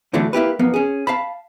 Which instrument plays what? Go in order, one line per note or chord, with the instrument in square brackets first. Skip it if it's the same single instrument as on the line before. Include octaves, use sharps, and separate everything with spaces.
[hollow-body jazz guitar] G2 D3 E3 F#3 A3 D4
A#3 E4 G4 B4
B1 F2 A#3 B3
C#4 G#4
F5 A5 B5